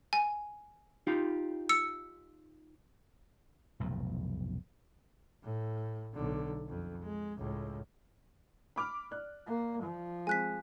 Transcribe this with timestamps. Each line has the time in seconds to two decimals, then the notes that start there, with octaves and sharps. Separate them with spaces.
0.13 G#5
1.07 D#4 F4 G4
1.69 E6 C#7
3.80 F1 B1 A2
5.43 A2
6.13 B1 D3
6.69 F2
7.03 G#3
7.38 C#2 A2
8.76 B5 D6 F6
9.11 D5 F#6
9.47 A#3
9.83 F3
10.27 G#3 C4 G#5 F#6 B6